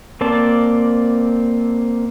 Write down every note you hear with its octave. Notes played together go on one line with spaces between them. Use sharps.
A#3 C4 D5 A5